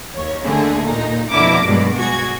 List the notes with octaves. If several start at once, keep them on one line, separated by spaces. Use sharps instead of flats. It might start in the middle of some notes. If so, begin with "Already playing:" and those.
D#2 C#5
D3 A3 G#4
A#2 D#4
F2 B2 D3 E4 A#4 D6
G2 B2 F#3 G#3
F#4 G#4 G#6